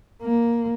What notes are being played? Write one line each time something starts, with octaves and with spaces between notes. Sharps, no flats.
A#3